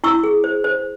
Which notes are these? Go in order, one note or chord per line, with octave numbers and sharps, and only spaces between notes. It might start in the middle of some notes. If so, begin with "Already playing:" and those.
E4 C#6 E6
G#4
C5
C5